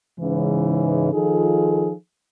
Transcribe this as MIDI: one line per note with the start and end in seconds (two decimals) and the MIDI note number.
0.19 1.08 44
0.19 1.08 49
0.19 1.08 52
1.12 1.91 51
1.12 1.91 53
1.12 1.91 63
1.12 1.91 65
1.12 1.91 68
1.12 1.91 69